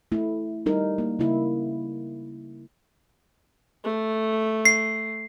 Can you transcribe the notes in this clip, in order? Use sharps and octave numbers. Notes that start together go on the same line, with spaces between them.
A3 E4
G3 D#4 A#4
A#3
C#3 A#3 E4
A3
C7